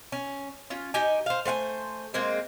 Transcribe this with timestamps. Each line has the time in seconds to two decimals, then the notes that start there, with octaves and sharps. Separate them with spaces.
0.12 C#4
0.70 C#4 F4
0.94 D#4 G4 G#5
1.26 C5 F5
1.45 A3 C5 F#5 G#5
2.14 G#3 A#3 C4 G#4